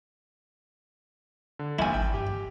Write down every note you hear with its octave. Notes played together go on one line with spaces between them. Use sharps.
D3
A#1 D#2 E4 G#5
G#1 G5
G2 G4